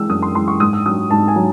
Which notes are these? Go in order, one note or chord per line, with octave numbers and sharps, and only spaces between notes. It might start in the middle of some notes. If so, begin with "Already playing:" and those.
Already playing: E3 G#3 E6
F#2 D#6
C6
E3 G#3 C6
C#6
G#2 D#6
E6
F#3 D#6
G#2 A5
G#5
F#3